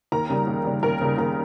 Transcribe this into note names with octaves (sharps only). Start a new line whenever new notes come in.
D#2 A#4 A#5
C#3 G3
D#2
C#3 G3
D#2 A#4 A#5
C#3 G3
D#2 A#4 A#5